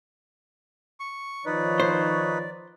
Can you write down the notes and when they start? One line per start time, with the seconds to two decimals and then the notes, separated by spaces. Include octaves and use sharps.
1.00 C#6
1.46 D#3 F3 D#4 B4 C#5 D5
1.80 C5